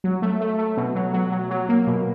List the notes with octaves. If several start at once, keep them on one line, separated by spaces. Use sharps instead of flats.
F#3
A3
A3
A3
B2
F#3
F#3
F#3
F#3
A#3
B2